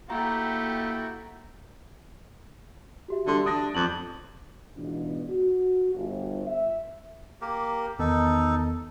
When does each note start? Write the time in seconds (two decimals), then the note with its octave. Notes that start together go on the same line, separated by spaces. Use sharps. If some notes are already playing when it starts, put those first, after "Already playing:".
0.10 A3 A#3 E4 F#4 G4 G5 A#5
3.08 F#4 G4 E5
3.27 D3 G3 C6
3.46 D4 D#6 A#6
3.75 F2 A5 D6 F#7
4.77 C#2 G#2 B2 E3 B3 D4
5.29 F#4
5.94 G1
6.46 E5
7.41 A#3 G4 A#4
7.99 E2 D#3 B3 D#4 A4